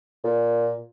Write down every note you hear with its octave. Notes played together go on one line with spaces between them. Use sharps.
A#2